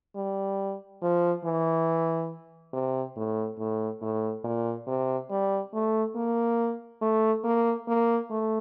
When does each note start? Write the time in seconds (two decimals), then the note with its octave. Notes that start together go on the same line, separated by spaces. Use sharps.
0.16 G3
1.02 F3
1.44 E3
2.73 C3
3.16 A2
3.59 A2
4.02 A2
4.44 A#2
4.87 C3
5.30 G3
5.73 A3
6.16 A#3
7.01 A3
7.44 A#3
7.88 A#3
8.30 A3